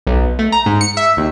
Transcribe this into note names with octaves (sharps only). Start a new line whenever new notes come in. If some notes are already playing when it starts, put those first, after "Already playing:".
B1
A3
A#5
G#2
C#7
E5
D#2